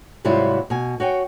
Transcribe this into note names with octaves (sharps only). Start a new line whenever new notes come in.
G#2 C3 F#3 G3 E4 F4
B2 G#5
F#4 C#5 G5 G#5